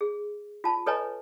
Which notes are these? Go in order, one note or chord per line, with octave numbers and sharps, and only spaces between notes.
G#4
F4 A5
A4 B4 C#5 D#5 G#5 A#5